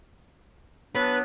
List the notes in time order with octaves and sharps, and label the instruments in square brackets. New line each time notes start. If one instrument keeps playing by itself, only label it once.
[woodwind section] F#3 B3 D4 [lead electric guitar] B4